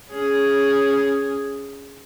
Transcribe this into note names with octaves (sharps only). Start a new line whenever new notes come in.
C#4 G#4